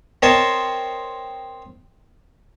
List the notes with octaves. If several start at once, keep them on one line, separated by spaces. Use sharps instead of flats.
C4 A#4 C#5 D#5 A5 C6